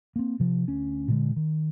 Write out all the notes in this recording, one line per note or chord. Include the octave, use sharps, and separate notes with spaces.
A#3 C4
C3 F3
D2 C#4
A#2 D3 G#3
D#3